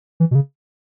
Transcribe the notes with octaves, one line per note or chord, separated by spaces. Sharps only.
E3
B2
C#3